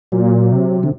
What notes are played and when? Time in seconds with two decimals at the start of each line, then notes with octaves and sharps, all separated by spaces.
0.12 A#2 F#3
0.52 C3
0.83 D3